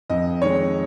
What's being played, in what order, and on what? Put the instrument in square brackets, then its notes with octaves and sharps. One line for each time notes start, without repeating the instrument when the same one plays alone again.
[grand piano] F2 D#5
D#3 G#3 C#5